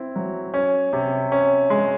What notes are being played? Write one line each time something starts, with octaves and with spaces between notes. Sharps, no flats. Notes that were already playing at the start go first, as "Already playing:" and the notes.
Already playing: C4 E4
F#3
C#4
C3
C#4
G#3